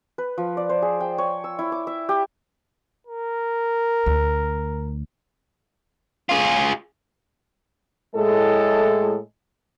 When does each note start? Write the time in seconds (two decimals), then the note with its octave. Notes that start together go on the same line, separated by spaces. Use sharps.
0.18 B4
0.38 F3
0.57 D5
0.69 C5
0.82 G#4
1.00 G5
1.18 C#5
1.44 E6
1.59 E4
1.72 D6
1.87 E5
2.09 G4
3.07 A#4
4.06 D2
6.29 F4 G#4
8.15 A2 G#3 A4